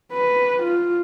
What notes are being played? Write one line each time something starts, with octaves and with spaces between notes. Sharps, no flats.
B4
F4